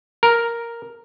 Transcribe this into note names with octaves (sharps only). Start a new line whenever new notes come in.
A#4